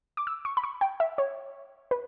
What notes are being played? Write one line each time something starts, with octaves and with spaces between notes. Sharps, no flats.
D6
E6
C#6
B5
C#6
G5
E5
C#5
B4